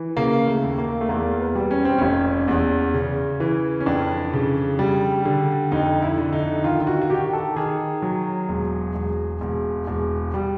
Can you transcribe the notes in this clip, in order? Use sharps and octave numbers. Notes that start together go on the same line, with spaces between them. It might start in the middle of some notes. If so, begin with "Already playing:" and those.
Already playing: E3
C#3 A#3
A3
D#2
A#3
A3
E2 A#3
B3
G3
C#4
C4
F1 C#4
E2
C#3
E3
C#4
F2 D4
C#3
G3
D3
F2 D#4
E4
D3
D#4
D#3 F4
F4
F#4
F#4
D#3 G4
A4
D#3 G#4
F#3
E1
E1
E1
E1
G3